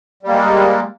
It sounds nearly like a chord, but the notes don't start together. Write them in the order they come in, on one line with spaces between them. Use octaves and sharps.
G3 A#3 G#3